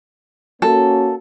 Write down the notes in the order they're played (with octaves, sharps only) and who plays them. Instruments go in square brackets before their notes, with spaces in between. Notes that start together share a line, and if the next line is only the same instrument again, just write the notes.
[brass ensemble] A#3 C#4 F#4 [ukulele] A4